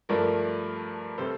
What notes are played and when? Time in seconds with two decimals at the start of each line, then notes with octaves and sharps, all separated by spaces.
0.09 G2 F3 A3 A#4 D5
1.18 C3 G3 A4 C5